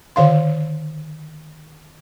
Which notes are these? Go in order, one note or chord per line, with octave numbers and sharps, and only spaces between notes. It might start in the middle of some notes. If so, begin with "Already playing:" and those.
D3 D#3 F5 C6